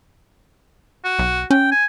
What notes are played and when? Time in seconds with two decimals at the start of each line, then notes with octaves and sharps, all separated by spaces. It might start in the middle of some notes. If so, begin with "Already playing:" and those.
1.04 F#4
1.19 B1
1.51 C#4 G5
1.71 G#5